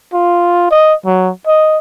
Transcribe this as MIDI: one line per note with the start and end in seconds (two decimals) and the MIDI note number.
0.13 0.68 65
0.71 0.94 75
1.06 1.31 54
1.47 1.79 75